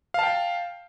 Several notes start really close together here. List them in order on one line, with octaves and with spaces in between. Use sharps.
F5 A5 G5